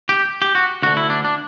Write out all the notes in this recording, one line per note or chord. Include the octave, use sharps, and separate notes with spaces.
G4
G4
F#4
D2 D3 F#4
E4
D4
D4